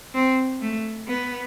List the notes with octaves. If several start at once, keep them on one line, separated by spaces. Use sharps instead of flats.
C4
A3
B3